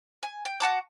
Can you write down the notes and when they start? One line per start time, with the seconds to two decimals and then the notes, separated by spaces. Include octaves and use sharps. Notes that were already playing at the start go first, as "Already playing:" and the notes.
0.23 G#5
0.45 G5
0.60 F#4 F#5 A5 D6